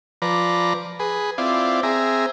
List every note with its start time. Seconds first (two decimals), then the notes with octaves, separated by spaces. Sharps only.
0.22 F3 B4 D5 A#5
1.00 G#4 B4
1.38 C4 E4 F4 D5
1.83 C4 G#4 E5 A#5